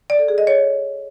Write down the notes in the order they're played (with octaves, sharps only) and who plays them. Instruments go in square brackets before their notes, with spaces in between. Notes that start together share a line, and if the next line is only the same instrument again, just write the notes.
[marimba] D5
A4
G#4
D#5
C#5